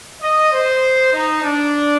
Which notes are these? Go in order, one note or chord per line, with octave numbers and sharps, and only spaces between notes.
D#5
C5
D#4
D4